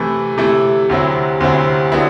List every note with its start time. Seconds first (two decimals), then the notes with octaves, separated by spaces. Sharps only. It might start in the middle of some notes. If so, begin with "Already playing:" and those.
Already playing: C3 E3 A3 E4
0.38 C3 E3 A3 E4
0.89 D2 C3 F#3 C4 E4
1.40 D2 C3 F#3 C4 E4
1.92 D3 F#3 B3 E4